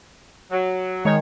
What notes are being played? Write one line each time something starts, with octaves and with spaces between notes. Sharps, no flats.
F#3
D#3 G#3 C#5